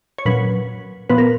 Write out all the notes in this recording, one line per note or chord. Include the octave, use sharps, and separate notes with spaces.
C#5
A#2 F#3 C#4 B4
A#2 F3 B3 B4
A#4